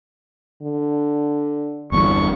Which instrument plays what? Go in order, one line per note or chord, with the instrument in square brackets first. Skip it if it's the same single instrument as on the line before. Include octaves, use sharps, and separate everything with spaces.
[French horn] D3
[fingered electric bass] G1 E2 [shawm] C#6